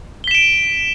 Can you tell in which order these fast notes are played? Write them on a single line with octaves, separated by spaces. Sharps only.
G7 B6 E7 D7